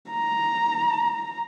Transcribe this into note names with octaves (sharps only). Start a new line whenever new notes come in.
A#5